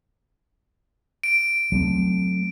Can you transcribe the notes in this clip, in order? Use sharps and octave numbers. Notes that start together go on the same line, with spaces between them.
D7
F#3 A3 C4